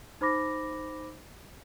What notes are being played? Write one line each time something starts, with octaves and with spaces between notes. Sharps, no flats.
D#4 C5 B5 D6 A#6